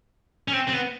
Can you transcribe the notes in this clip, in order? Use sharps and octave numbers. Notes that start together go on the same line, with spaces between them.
C#4
C4
C4
B3